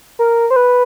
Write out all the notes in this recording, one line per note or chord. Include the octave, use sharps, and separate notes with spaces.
A#4
C5
B4